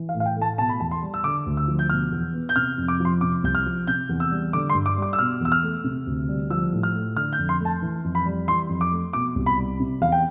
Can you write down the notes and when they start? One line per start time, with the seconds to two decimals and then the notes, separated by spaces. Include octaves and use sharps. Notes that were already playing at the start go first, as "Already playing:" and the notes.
Already playing: E3
0.09 F5
0.14 A2
0.20 F5
0.26 G5
0.36 A3
0.42 A5
0.58 B2 A5
0.69 B5
0.80 E2 A5
0.91 C6
1.02 G3
1.14 E6
1.24 D3 D6
1.46 D2
1.57 E6
1.68 F3
1.79 G6
1.90 B2 F6
2.12 E2
2.34 B3
2.49 G6
2.56 C3 F6
2.78 F2
2.88 D6
3.00 F3
3.05 C6
3.21 C3 D6
3.44 C2 G6
3.55 F6
3.66 F3
3.87 C3 G6
4.09 E2
4.20 E6
4.31 G3
4.53 D3 D6
4.70 C6
4.74 G2
4.86 D6
4.97 G3 D6
5.13 E6
5.19 B2 F6
5.41 E2 E6
5.52 F6
5.63 A3
5.84 C3
6.07 D2
6.29 G3
6.50 F3 E6
6.72 A2
6.83 F6
6.94 A3
7.16 D3 F6
7.33 G6
7.38 F2
7.49 C6
7.60 A3
7.65 A5
7.82 E3
8.04 F2
8.15 B5
8.26 G3
8.48 E3 C6
8.69 F2
8.81 D6
8.92 A3
9.13 B2 D6
9.36 C2
9.46 B5
9.58 G3
9.80 C3
10.01 E2 F5
10.12 G5